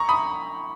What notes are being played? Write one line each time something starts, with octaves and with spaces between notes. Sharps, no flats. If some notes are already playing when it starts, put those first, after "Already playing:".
Already playing: A#5 C#6
B5 D#6